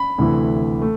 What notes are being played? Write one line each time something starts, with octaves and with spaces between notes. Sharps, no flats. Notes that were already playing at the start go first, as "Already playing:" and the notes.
Already playing: B5
D2 C3 E3 A3
A3